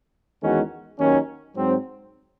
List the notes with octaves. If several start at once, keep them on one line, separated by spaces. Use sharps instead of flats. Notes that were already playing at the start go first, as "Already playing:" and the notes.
E2 D#3 G#3 C#4 F#4
D#2 D#3 F#3 C#4
G#2 F#3 C4